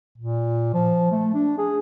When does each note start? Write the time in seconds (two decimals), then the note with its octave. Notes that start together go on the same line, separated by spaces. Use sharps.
0.18 A#2
0.74 F3
1.12 A3
1.34 D4
1.58 G#4